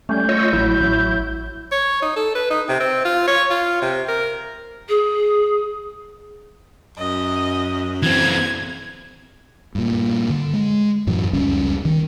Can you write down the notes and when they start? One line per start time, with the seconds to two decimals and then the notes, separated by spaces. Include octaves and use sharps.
0.09 G3 A3 C#4 G6
0.29 F4 C#5 D#5 E6
0.53 A1 F#3 E4
0.80 A1
1.72 C#5
2.02 D#4
2.16 A4
2.35 B4
2.50 D#4
2.69 C3
2.80 C4
3.05 F4
3.27 C#5
3.50 F4
3.82 C3
4.08 A#4
4.89 G#4
6.98 F#2 D#5
8.03 E3 C4 G#6
9.75 G2 A#2
10.30 D3
10.53 G#3
11.07 F#2 A2 E3 F#3
11.33 F1 C#2 G3 C#4
11.85 D#3